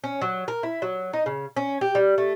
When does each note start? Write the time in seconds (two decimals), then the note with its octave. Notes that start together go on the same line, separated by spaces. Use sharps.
0.04 C#4
0.22 F#3
0.48 A#4
0.63 E4
0.82 F#3
1.13 D#4
1.26 C#3
1.56 C#4
1.81 G4
1.95 G3
2.18 A3